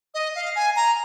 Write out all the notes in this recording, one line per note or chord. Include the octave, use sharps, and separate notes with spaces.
D#5
F5
G#5
A#5